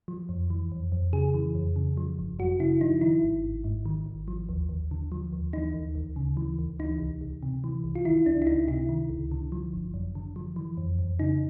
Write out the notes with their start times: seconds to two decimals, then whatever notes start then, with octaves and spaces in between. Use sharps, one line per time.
0.08 F3
0.29 F2
0.50 E3
0.72 F2
0.92 F2
1.13 C#3 G#4
1.34 E3
1.55 F2
1.76 C#3
1.97 F3
2.19 G1
2.39 F#2 F#4
2.60 C#3 E4
2.81 F3 D#4
3.01 D#3 E4
3.23 G#1
3.44 G#1
3.64 G#2
3.85 D#3
4.06 G#1
4.28 F3
4.49 D#2
4.69 D#2
4.91 D3
5.12 F3
5.33 D#2
5.53 E3 D#4
5.74 D2
5.95 D2
6.16 C#3
6.37 E3
6.59 D2
6.79 E3 D#4
7.00 C2
7.21 C2
7.43 C3
7.64 E3
7.84 C2
7.95 F4
8.05 D#3 E4
8.26 C#2 D4
8.42 E4
8.47 C#2 D#4
8.68 C3 E4
8.89 D#3
9.10 C#2
9.31 D3
9.52 F3
9.73 G1
9.94 F#2
10.15 D3
10.36 F3
10.56 E3
10.77 F2
10.99 F2
11.19 C#3 D#4